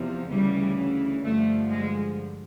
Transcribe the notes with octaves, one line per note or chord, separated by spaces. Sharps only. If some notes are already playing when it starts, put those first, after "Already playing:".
Already playing: E2 C3 F3
D2 C#3 E3 G3
G2 D3 F3 A3
G#3